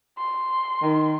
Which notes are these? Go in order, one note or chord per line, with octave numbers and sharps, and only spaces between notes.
C6
D#3